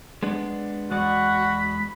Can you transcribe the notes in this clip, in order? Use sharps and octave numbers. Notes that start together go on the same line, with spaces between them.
G#3 B3 D4
E2 G#3 F#4 D5 B5